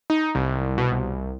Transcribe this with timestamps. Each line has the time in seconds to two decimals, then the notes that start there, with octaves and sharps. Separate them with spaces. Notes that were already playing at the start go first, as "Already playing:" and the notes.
0.10 D#4
0.35 C2
0.78 B2
0.92 C2